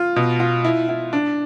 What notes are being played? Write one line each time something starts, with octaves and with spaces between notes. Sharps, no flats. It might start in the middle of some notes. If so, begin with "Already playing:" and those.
Already playing: F4
B2
F4
E4
E4
D4